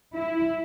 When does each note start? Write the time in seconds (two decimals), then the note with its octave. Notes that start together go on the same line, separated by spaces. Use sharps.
0.14 E4